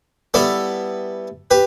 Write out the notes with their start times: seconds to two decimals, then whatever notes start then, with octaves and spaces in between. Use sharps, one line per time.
0.34 G3 B3 E4 A4 D5
1.51 G4 B4